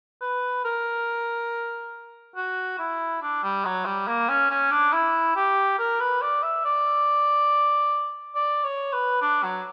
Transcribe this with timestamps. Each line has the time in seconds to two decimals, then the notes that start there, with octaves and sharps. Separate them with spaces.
0.22 B4
0.65 A#4
2.36 F#4
2.79 E4
3.22 D4
3.43 G3
3.65 F#3
3.85 G3
4.08 A#3
4.29 C#4
4.50 C#4
4.71 D4
4.93 E4
5.36 G4
5.79 A#4
6.00 B4
6.22 D5
6.43 E5
6.64 D5
8.35 D5
8.64 C#5
8.93 B4
9.22 D4
9.43 F#3